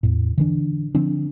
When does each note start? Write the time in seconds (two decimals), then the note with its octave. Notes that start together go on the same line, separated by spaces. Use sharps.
0.03 E2 A2
0.38 D3 E3 D4
0.95 D3 F3 C4 D4